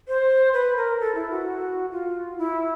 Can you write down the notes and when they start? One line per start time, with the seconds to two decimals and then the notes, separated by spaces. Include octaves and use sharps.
0.08 C5
0.53 B4
0.77 A#4
1.00 A4
1.15 E4
1.31 F#4
1.92 F4
2.38 E4